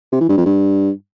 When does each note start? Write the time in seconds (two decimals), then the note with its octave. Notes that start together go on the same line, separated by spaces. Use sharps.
0.12 C3
0.21 E3
0.29 G2
0.37 F2
0.46 G2